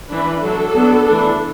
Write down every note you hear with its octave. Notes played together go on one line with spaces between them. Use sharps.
E3 D4 B4
F#3 D4 A4
F#3 B3 D4
E3 A3 D4